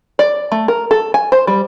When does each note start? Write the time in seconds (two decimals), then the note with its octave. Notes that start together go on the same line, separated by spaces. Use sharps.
0.19 D5
0.52 A3
0.68 A#4
0.91 A4
1.14 G#5
1.32 C5
1.47 G3